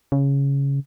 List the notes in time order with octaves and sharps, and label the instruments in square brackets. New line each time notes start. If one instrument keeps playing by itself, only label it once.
[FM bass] C#3